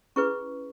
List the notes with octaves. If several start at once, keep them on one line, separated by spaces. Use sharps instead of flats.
C#4 E4 G#4 B4 C#6